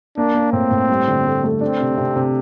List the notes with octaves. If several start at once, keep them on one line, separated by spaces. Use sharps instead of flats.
A#3 D4
A#3
A2 C4
A2
G2
D3
A3
A3
C4 D4
C3
C3
C3